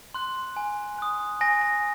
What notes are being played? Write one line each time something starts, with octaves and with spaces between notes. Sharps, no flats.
C6 F#6
G#5
D#6 F#6
G#5 A#6
A#6